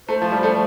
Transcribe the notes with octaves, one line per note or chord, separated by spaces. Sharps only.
A3 C5
F3
G3
A3